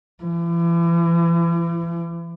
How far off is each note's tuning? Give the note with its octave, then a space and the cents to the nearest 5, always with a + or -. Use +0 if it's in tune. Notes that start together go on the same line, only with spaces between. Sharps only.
E3 +40